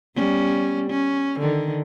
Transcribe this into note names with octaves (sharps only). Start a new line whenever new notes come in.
G3 B3 C#4
C#4
D3 D#3